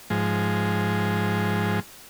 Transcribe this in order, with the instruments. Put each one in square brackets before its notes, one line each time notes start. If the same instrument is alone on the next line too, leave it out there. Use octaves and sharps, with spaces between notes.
[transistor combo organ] G#2 F3 G#3